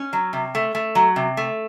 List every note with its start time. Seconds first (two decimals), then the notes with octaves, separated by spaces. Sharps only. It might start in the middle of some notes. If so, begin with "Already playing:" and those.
Already playing: C#4
0.13 F#3
0.33 C3
0.55 A3
0.75 A3
0.95 F#3
1.16 C3
1.37 A3